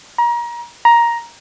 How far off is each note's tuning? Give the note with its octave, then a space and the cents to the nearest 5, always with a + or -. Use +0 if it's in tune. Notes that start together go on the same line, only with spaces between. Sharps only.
A#5 +30
A#5 +10